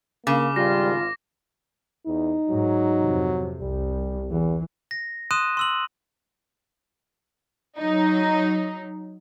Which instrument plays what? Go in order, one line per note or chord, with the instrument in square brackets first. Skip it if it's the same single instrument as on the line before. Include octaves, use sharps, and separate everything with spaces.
[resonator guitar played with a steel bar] C#3 [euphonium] A#3 [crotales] D6
[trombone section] G#1 F4 [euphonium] G3 [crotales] A#6
[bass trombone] E2 [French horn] D#4
[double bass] G#2 [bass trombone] F#3
[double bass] F2 C3
[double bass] C2 [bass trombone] G3
[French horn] E2 [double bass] E3
[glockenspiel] A#6
C6 D#6 F#6 D#7 E7
C6 E6 F#7
[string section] F#3 D#4